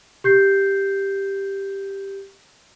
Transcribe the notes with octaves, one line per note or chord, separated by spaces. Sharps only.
G4 G6 C7